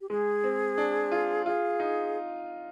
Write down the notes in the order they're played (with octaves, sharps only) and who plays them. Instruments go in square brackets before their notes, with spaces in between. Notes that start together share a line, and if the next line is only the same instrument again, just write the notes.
[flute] G4
[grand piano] G#3 [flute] G#4
[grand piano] C4
D4
F4
[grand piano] F4 [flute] G#4
[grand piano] D#4